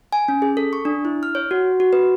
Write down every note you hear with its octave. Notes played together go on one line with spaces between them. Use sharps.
G#5
C#4
G#4
A4
C#6
D4
E4
F6
C#5
F#4
F#4
B4